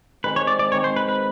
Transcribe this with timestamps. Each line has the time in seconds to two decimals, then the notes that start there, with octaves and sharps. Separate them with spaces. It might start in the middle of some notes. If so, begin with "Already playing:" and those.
0.24 D#3 G#3 C4 D#4 B4
0.36 C#5
0.47 D5
0.59 D5
0.72 D#3 G#3 C4 D#4 C#5
0.84 C5
0.96 B4
1.09 B4